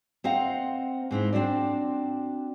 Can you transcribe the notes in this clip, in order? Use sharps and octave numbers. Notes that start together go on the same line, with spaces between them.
C4 C5 D#5 F5 F#5 A#5
G#2 C4 D#4 E4
C4 D4 F#4 D5